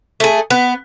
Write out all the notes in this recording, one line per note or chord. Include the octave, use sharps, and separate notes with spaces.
A3 G#4
B3